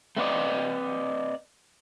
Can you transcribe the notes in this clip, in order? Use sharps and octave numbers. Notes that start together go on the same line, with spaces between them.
A3 C4 B4 D5 D#5